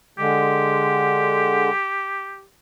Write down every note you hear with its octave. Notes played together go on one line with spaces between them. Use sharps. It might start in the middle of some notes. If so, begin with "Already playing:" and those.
D3 G#3 G4